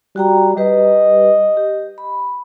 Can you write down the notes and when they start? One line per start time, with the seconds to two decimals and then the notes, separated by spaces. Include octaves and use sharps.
0.16 G3 F#4 G5 A#5
0.57 G3 G4 B4 D#5
1.57 G4
1.98 B5